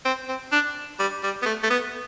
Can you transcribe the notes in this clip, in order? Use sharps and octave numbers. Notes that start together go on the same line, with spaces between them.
C4
C4
D4
G3
G3
B3
A3
A3
B3